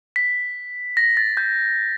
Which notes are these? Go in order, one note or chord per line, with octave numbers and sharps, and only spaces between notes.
B6
A#6
A6
G6